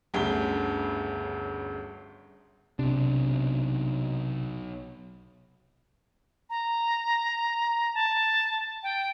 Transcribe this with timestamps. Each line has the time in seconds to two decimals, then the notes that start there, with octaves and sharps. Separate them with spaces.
0.14 G1 D2 C#3 G7
2.79 B1 C3 D4
6.50 A#5
7.94 A5
8.83 G5